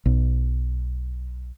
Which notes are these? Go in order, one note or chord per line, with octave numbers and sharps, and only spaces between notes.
B1